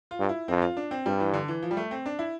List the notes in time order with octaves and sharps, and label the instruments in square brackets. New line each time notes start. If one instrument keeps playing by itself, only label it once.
[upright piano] F4
[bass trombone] G2
[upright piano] E4
[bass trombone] F2 [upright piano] C4
[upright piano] F4
D4
C4
[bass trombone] G2 [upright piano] G3
[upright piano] E3
D3
E3
F3
G3
A3
C4
D4
E4